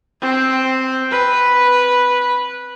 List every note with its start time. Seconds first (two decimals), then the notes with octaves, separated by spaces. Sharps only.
0.21 C4
1.11 B4